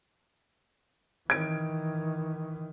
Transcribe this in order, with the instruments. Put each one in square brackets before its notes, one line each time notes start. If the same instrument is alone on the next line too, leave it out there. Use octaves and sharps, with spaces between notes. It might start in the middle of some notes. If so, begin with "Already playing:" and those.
[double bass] D#3 E3 [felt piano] G#6 D7